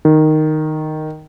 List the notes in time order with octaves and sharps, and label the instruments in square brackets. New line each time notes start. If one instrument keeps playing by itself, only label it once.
[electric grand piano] D#3